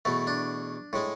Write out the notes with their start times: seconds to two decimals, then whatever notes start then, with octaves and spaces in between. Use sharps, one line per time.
0.05 E2 B2 A3
0.27 D4
0.93 A2 G#3